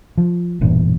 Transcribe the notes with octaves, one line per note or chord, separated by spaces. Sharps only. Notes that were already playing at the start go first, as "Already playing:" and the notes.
F3
E1 E2 G2 A#2